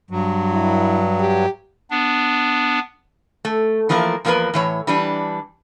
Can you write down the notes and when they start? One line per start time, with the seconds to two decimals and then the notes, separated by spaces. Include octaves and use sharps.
0.11 G2 F#3
0.52 E4
1.19 G4
1.91 B3 D4
3.45 A3
3.89 E3 F3 A3 A#3 A#4
4.25 E2 F3 A#3 B3 A#4 B4
4.54 A2 E3 C#5
4.87 E3 G3 D4